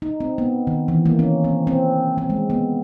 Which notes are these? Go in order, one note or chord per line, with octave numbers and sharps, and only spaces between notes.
D#4
C4
B3
D#3
E3
A#3
C#4
C4
C4
C4
G#3
B3